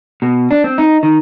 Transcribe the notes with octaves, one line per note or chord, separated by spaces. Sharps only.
B2
D4
C4
D#4
D#3